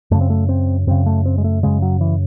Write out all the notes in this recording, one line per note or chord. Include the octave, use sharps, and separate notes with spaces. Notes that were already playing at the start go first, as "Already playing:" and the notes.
F#2 C#3 A3
C4
A3
C4
F#2 C#3 C4
A3
C4
G#3
A3
F#2 C#3 G#3
F#3
E3